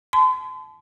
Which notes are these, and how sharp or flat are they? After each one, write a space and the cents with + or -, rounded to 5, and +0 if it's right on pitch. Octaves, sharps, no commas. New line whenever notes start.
A5 -25 C6 -40